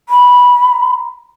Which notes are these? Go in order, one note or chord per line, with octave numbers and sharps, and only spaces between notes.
B5